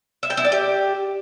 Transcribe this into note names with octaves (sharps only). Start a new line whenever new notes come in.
E5
G5
E4
D5
G4